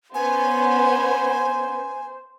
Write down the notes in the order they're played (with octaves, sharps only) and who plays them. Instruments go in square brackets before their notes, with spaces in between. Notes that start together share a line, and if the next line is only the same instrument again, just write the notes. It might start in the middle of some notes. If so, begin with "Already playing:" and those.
[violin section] B3 C#4 [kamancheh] C5 [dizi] G#5